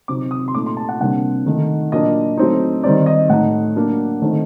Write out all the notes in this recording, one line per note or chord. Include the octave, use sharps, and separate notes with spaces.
C3 F#3 C4 D#4 D6
D#6
C6
A#2 A3 D#4 D6
C6
A5
F#5
C3 G3 A#3 D4 F#5
D#3 A3 D#4
A#2 F#3 A#3 D4 D#5
F#3 A3 C4 D#4
D#3 G3 C4 D#4 D5
D#5
A2 A3 D#4 F#5
F#3 A#3 D4
D#3 A3 C4 D#4